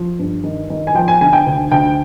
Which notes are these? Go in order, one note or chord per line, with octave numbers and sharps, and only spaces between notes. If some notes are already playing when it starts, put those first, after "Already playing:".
Already playing: F3
G2
D#3
D#3
G#5
F3 G5
G#5
D3 G#5
G5
D2
D2 G5